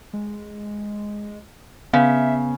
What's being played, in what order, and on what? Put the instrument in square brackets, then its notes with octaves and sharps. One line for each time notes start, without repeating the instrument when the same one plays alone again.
[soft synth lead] G#3
[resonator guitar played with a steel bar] C#3 [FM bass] B3 [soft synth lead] E5 [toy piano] F5